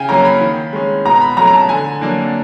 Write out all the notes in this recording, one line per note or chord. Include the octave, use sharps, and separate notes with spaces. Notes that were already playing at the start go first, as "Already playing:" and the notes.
Already playing: C#3 G5 G#5
F#3 A#3 C#4 A#5
B5
D#3
G#3 C#4
B2 A#5
B5
F#3 A3 C#4 A#5
A#5
A5
D3 G#5
F#3 A#3 D4